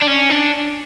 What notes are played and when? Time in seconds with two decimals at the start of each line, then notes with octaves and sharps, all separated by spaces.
0.02 D4
0.08 C#4
0.30 D4